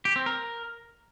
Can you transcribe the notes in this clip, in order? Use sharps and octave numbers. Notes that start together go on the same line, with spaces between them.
G4
C4
A#4